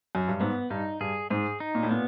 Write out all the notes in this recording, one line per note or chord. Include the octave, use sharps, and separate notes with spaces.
F#2
G2
G#2 B3
G2 D#4
G2 G#4
G#2 G#4
D#4
A#2
A2
A#2 B3